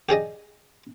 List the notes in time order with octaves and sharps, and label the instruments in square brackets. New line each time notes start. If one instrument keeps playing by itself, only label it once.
[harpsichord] G4 G#4 D5 D#5